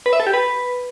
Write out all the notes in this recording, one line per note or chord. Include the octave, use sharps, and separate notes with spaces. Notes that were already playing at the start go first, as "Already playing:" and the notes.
B4
E5
A4
G4
B4